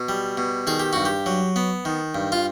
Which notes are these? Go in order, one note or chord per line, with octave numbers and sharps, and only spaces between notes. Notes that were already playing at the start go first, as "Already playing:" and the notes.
Already playing: B2
G3
B2
D#3 G#4
G4
G2 F#4
G4
F#3
B3
D#3
G2
F4